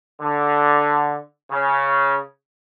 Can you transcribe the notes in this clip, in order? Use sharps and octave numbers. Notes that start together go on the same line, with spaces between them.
D3
C#3